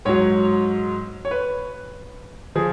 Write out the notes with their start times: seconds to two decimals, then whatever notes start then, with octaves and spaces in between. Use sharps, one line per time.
0.05 G#2 F#3 C#5
1.25 C#5
1.31 B4
2.56 F3 G#4